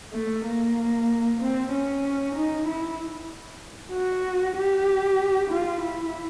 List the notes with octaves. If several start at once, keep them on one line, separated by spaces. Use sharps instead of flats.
A3
A#3
C4
C#4
D#4
E4
F#4
G4
F4
E4